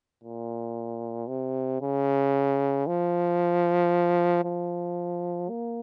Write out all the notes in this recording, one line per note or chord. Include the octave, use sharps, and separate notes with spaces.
A#2
C3
C#3
F3
F3
A#3